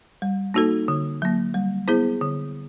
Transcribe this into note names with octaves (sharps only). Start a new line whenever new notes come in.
G3
A#3 D#4 F#4 A4
D3
F#3 A#3
G3
B3 E4 G#4 C5
D3